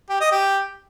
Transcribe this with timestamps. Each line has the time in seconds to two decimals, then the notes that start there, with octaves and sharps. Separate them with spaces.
0.09 G4
0.21 D#5
0.32 G4